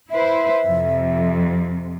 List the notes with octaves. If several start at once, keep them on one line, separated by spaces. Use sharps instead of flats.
E4 B4 C5 E5
F2 C3